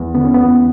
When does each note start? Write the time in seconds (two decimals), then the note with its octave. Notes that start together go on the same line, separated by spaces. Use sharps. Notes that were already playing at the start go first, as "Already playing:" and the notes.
Already playing: E2
0.15 D3 B3
0.25 C#4
0.34 B3
0.40 E2